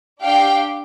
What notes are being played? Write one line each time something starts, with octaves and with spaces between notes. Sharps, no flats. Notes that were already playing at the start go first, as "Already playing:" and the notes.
D4 G4 F5 G5